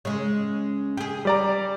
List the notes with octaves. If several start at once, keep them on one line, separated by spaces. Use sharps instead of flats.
C#3 G#3
G4 G#4
G3 D5 A#5